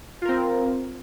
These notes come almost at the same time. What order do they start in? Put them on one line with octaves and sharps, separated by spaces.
F4 A#4 C4